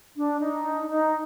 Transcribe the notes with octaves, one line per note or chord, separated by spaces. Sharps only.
D4
D#4
D#4